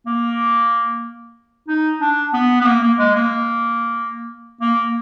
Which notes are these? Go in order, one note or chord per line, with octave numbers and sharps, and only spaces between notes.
A#3
D#4
D4
B3
B3
A#3
A#3
G#3
A#3
A#3